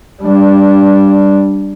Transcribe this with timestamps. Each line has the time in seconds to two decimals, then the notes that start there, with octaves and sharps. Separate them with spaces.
0.23 G3 D4